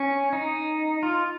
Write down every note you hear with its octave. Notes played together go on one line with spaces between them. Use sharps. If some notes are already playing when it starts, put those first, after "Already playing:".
Already playing: C#4
D#4
F4